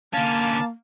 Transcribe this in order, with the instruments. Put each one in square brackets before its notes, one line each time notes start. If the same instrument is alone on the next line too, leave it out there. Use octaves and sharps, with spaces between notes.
[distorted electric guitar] D3 C#4 [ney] A#3 [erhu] F5 [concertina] A5